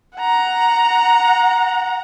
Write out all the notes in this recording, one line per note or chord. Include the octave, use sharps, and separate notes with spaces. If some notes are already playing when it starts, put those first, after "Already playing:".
F#5 A#5